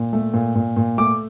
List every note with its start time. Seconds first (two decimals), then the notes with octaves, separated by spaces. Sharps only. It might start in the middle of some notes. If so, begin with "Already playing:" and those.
Already playing: A#2
0.13 A3
0.34 A#2
0.55 A#2
0.76 A#2
0.98 A3 D6